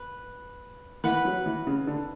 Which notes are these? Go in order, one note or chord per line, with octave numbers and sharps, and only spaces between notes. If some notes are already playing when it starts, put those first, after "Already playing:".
Already playing: B4
E3 B4 F#5 B5
F#3
E3
C#3
D3